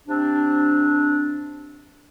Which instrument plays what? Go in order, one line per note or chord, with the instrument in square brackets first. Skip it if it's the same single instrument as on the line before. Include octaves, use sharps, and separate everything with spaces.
[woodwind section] C3 C4 D4